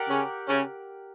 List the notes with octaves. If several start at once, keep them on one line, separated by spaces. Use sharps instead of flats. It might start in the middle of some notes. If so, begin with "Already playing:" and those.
Already playing: G4 A#4 D5 F#5
C#3 C#4
C#3 C#4